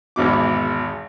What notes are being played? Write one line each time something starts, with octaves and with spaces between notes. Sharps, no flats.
G#1 E2 B2 D6